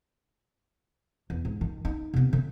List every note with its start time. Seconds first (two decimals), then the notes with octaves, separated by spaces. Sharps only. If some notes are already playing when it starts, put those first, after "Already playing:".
1.30 E2
1.45 G#2
1.61 D#3
1.85 D#4
2.14 C3 B3
2.33 D3